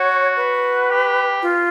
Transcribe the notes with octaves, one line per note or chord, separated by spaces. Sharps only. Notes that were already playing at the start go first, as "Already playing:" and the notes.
Already playing: F#4 C#5
B4
G4
F4